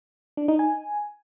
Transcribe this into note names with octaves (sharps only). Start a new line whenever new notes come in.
D4
D#4
G#5